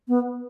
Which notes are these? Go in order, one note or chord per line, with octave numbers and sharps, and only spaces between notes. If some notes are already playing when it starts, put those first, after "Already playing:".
B3